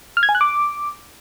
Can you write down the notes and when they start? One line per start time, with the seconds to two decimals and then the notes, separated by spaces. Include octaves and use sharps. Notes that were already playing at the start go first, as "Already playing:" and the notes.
0.17 F6
0.23 G#6
0.29 G#5
0.35 F#6
0.41 D6